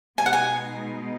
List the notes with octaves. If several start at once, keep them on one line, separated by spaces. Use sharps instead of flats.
B2 G#3 B3 D#4 G#5
F#5
G#5